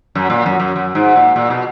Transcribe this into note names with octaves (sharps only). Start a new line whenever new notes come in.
F#2
A#2
F#2
F#2
F#2
G#2
A#2
A#2
B2